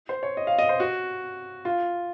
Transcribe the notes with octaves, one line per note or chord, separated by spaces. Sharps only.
C5
C#5
D#5
F5
D#5
C5
F#4
F4